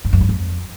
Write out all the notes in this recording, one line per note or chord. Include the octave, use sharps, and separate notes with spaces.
G2
F#2
G2
F2